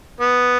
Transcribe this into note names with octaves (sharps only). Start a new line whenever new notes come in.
B3